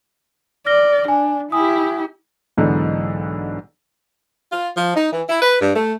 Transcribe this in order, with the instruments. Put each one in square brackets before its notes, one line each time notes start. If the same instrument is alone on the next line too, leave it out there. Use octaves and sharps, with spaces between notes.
[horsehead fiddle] D5 [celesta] F6 A#6 G7
[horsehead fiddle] D4 [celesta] G#5
[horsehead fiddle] E4 G4 [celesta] G#5 D#6
[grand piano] B1 G#2 D3 E3 D#4
[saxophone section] F4
F3
D#4
E3
E4
B4
G2
A3